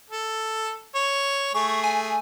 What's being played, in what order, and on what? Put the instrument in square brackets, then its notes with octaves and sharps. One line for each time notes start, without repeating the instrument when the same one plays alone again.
[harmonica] A4
C#5
[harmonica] A3 G#4 [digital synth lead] C#6
[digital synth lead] G#5